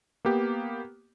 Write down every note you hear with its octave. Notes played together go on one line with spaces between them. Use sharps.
A#3 B3 G4